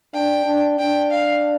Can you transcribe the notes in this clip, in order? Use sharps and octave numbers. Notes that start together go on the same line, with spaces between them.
D4 G5
D4
D4 G5
F5